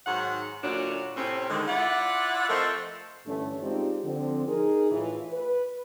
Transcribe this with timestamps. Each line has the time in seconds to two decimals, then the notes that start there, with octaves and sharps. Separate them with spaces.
0.06 G#2 D#3 F#3 F#5
0.64 D2 A#2 F#3 C#4 D4 D5
1.17 A2 C3 C4 C#4
1.50 D3 D#3 G#3
1.68 E4 F4 D5 F#5
2.49 F3 A3 C4 A4 A#4 D#5
3.26 G2 D3 E3 A3 C#4
3.62 G#3 C4 D#4 F4 G4 D5
4.05 D3 F3 C4
4.47 D#4 G#4 A#4
4.91 A2 E3 F4
5.33 B4